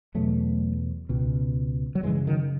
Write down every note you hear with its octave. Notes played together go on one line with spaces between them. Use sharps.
E2 B2 F#3 A3
C#2 B2
F#3
F#2 C#3 E3 G#3
D#3 F#3